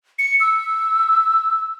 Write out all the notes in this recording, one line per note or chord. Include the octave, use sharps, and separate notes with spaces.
C#7
E6